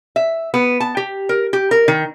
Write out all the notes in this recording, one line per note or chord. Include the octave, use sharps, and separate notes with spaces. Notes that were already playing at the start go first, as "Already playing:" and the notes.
E5
B3
A5
G4
A#4
G4
A#4
D#3